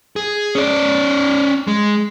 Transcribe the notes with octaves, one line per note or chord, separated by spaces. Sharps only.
G#4
C#4 D5
G#3